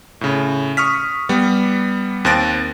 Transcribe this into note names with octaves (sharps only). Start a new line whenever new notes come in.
A2 C#3
C#6 D#6 F6 B6
G3 B3
D#2 C4 F#6 A6 A#6 D7